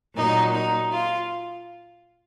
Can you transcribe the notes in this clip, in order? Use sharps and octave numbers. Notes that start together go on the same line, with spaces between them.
A#2 F#3 D#4
D#4
F4